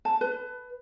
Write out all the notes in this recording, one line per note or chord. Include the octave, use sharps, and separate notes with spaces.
A5
B4